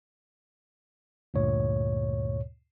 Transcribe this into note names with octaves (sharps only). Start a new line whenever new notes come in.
D2 G2 A#2 C#5